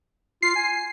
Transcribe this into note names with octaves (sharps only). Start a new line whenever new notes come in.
F4 C7
G#5